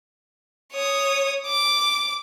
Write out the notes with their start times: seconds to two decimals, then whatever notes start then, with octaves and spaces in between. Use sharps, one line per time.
0.73 C#5 D#6
1.47 D6